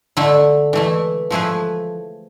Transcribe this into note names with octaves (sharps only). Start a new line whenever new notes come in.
D3 A3 E4
E3 A3 E4
F3 A3 E4 G#4 B4